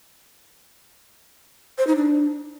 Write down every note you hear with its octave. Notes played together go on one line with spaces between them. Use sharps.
C5
D#4
D4